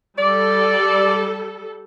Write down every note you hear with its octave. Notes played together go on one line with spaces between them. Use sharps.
G3 A4 D5